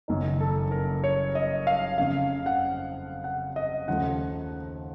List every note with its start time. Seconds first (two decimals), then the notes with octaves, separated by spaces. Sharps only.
0.08 F#1 F#2 D#3 A#3 D#4
0.41 A4
0.71 A#4
1.04 C#5
1.35 D#5
1.67 F5
1.98 F2 C#3 F3 F5
2.46 F#5
3.24 F#5
3.56 D#5
3.87 D#2 C#3 F3 A3 D#4 F#5